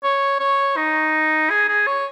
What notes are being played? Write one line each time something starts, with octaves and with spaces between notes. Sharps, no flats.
C#5
C#5
D#4
G#4
G#4
C#5